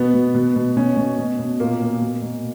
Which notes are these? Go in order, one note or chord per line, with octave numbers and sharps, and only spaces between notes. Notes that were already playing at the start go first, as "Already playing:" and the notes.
Already playing: B2 B3
B2
B2
B2
B2 C#4
B2
B2
B2
A#2 A#3
A#2
B2
B2